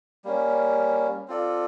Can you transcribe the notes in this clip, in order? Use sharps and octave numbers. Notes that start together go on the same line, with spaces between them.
G3 A#3 C#4
C4 F4 A4 D5